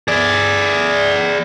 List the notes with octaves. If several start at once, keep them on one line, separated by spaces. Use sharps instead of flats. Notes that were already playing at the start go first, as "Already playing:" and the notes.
G#4 D5